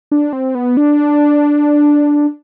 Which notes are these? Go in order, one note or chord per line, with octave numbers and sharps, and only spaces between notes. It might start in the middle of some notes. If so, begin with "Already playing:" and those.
D4
C4
B3
D4